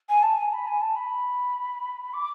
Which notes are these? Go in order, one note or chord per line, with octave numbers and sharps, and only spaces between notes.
G#5
A5
G#5
B5
G#5
A5
B5
D6